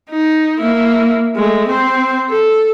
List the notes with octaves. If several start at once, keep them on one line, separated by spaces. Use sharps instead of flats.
D#4
A#3 E4
G#3 A3
C4 C5
A4